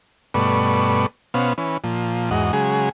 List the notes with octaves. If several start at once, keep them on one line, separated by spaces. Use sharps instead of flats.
G2 B2 A3 B4 D5 C#6
B2 B3 C#4 C5 F5
E3 C#4 B4
A#2 F3
E2 G#2 F#4 D#5
C#3 F#3 G#3 G#4